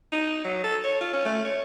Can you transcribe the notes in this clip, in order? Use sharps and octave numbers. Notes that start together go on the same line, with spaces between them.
D#4
F#3
A4
C#5
F4
C#4
A3
C#5